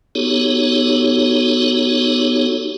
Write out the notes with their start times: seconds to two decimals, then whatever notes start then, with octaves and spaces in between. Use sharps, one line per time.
0.15 B3 D#4 F#4 G4 A4 C#5